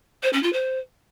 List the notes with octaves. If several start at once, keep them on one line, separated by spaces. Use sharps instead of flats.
C5
C#4
F4
C5